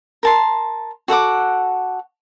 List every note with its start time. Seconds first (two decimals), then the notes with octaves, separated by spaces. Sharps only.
0.23 A#4 A5 C6
1.08 F#4 A4 F#5 D6